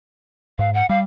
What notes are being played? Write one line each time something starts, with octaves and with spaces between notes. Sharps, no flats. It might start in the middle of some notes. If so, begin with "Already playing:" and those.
G#2 F5
F#5
G3 F5